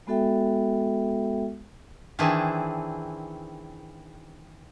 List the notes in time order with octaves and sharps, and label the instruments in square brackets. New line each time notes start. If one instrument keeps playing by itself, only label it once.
[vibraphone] G#3 B3 F#4 A4 E5 G5
[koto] D#3 E3 C4 D4 E4 G#4